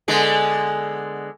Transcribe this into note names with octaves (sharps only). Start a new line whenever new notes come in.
D3 G#3 B3